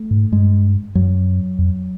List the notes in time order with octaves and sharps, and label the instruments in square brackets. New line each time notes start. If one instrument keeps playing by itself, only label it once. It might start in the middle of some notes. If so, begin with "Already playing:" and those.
Already playing: [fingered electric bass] A3
[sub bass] G#2
[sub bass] G2 [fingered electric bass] G#3
[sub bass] F#2 [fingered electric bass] F#3
[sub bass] F2